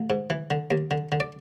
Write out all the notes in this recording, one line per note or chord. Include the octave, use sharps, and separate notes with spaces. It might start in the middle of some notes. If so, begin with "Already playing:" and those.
Already playing: A1
G#2
E3
D3
D#2
D3
D3
D5